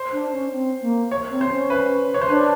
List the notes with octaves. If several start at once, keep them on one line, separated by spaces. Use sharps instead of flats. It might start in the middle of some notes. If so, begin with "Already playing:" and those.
Already playing: C5
D4
C#4
C4
A#3
C#5
C4
C5
C#4
B4
C#5
C5
D4 B4